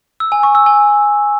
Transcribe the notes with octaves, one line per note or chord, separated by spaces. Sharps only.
E6
G#5
C#6
E6
G#5